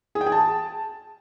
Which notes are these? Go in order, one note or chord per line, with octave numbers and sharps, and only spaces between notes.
G#4
G5
G#4
A5